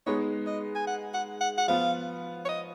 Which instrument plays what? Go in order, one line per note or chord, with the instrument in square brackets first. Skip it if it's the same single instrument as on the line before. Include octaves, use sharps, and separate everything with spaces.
[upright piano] G#3 B3 D#4 [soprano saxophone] C#5
[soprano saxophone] D#5
G#5
F#5
F#5
F#5
F#5
[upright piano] F3 B3 F4 [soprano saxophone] F5
[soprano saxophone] C#5
D#5